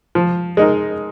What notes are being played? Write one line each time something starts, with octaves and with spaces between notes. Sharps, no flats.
F3
G#3 D#4 A#4